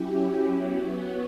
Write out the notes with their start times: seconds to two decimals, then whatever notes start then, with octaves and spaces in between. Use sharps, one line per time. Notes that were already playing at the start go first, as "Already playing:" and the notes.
Already playing: F#3 C#4 E4 G4
0.54 F#3 B3 F#4